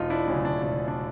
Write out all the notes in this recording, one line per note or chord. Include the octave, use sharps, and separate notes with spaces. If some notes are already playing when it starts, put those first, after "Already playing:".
Already playing: E1 D#4 F4
D4 E4
D2 C#3 F#3 C#4
D4
E1 D4
D4